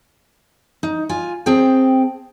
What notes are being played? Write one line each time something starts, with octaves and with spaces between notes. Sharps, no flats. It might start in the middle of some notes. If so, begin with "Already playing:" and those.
D#4
F4 G#5
C4 G#4 G5 A5